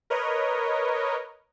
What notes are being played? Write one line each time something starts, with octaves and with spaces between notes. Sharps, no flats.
A#4 B4 C#5 D#5